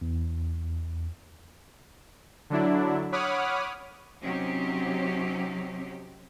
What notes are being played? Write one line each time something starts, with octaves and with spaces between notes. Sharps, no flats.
E2
D3 F#3 D4 E4
C#5 F#5 B5 D6 D#6 F6
C3 F#3 C4 C#4 D#4 G4